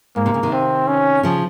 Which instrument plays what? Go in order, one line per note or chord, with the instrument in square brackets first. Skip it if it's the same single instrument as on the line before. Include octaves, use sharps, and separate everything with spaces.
[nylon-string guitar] G#2 [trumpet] A#3
[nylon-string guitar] C3
C#3
C3 D#3
[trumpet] C4
C#4
[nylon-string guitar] C#3 F3